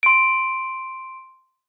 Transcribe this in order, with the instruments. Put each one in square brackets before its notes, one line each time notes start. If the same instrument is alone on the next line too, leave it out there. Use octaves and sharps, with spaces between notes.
[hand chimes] C6 D7